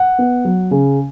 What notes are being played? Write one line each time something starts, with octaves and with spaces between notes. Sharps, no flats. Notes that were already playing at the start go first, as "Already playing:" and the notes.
Already playing: F#5
B3
F#3
C#3